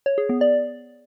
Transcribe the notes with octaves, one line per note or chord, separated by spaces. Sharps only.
C#5
G#4
B3
D5